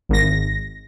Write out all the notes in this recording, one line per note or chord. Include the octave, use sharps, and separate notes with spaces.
G#1 A#6